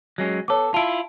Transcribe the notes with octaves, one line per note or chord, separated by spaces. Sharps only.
F#3 G#3 C#4
B3 A4 C#5 D6
E4 F4 A5 D7